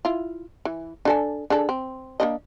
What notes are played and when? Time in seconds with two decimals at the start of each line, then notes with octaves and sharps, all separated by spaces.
0.05 E4 F4
0.65 E3
1.05 D4 A4 G#5
1.50 D4 G#4 A4
1.69 C4
2.20 A#3 D4 D#5